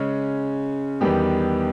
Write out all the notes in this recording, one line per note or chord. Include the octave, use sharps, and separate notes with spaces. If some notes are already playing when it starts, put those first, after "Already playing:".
Already playing: C#3 G#3 C#4
E2 D#3 G3 B3 G4